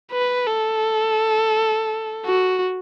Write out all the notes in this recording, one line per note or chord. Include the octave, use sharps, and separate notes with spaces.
B4
A4
F#4